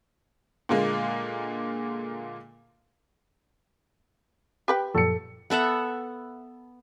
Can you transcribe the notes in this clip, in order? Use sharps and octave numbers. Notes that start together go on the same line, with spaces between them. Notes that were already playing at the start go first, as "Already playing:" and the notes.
A#2 D3 G#3 A#3
G4 B4 G5
F#2 A#2 F3 A4 C#7
B3 A4 E5 F#5